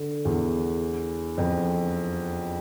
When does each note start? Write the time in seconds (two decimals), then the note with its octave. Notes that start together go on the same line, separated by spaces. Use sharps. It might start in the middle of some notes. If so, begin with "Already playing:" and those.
Already playing: D3
0.25 E2
1.38 F2